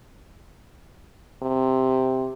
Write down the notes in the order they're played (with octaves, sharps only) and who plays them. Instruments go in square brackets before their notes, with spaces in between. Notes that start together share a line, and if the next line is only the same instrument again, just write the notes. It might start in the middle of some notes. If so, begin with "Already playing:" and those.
[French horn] C3